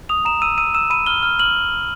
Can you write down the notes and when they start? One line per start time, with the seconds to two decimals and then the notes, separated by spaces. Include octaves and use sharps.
0.09 D#6 F7
0.25 A#5 E7
0.42 E6 D#7
0.58 E6 D#7
0.74 E6 E7
0.90 B5 D#7
1.06 F6 G7
1.23 F6
1.39 F6 F#7